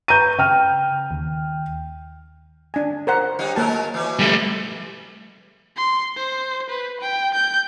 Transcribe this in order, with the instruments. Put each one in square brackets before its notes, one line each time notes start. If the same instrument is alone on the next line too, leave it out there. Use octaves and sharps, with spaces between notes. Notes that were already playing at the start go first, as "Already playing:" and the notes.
[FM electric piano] B4 A#5 C#6 [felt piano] G6 D#7
[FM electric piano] C#3 [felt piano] G5 F6
[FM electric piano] D#2
[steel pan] D4 G#5
A#4 C5 F#5
[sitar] F#3 G3 D#4
[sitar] F#3 G#3 A#4 [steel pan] A#3 A5
[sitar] E3 F#3
[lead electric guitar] G3 A3
[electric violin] C6
C5
B4
G5
G6